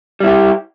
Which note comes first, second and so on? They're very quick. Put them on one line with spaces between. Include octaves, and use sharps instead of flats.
G3 E4 G4